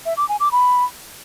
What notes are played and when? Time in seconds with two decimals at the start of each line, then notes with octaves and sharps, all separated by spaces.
0.06 E5
0.17 D6
0.29 G#5
0.40 D6
0.52 B5